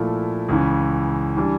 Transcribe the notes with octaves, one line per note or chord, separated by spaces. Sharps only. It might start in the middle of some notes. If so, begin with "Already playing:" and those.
Already playing: A#2 F3 A3 E4
C#2 C#3 E3
E3 G3 D4